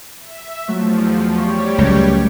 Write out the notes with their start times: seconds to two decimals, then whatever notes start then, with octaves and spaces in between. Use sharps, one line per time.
0.20 E5
0.68 E2 F3 F#3 A3
1.38 G3 G4 C5 C#5 F5 C#6
1.78 C#2 A#2 F#3 A3